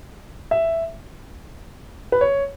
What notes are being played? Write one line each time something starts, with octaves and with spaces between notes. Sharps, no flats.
E5
B4
C#5